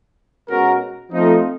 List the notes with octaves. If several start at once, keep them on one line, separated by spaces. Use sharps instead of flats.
B2 G#3 C#4 F#4 A#4
F3 A3 C4 D#4